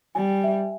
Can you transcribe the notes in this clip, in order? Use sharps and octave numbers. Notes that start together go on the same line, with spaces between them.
G3 G#5
E5